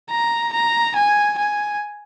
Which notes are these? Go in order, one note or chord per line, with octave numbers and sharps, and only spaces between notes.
A#5
A#5
G#5
G#5